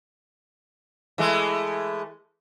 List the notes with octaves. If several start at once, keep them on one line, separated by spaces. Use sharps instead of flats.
E3 G#3 A3